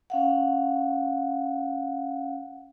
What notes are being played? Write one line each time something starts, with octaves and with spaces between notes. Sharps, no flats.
C#4 F5 F#5